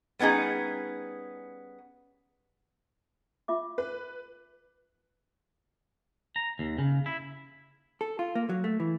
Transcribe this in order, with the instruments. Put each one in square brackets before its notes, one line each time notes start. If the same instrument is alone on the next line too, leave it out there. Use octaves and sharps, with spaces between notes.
[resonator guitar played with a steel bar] G3 B3 C#4 D#4 G#4
[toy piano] F4 E5 D6
[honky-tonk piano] B4
[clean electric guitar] A#5
D#2
C#3
E4
[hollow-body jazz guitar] A4
F4
A#3
F#3
A3
E3